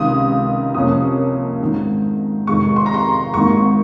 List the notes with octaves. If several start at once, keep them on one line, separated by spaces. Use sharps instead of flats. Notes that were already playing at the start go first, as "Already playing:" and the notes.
Already playing: C#2 C3 D#3 D#6
F2 C3 F3 A#3 C#4 D#6
G#1 G#2 D#3
F1 F2 D#3 G#3 C#6
C6
A#5
C6
G#1 G#2 D#3 A#3 C#6